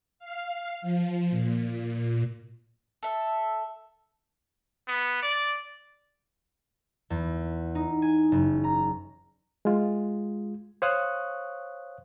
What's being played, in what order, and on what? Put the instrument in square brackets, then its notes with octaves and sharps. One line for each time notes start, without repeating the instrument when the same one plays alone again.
[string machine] F5
F3
A#2
[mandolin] A4 E5
[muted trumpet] B3
D5
[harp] E2
D#4
G#5
F#1
A#5
[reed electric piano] G#3 F4
C5 C#5 F5 C#6 D#6 F#6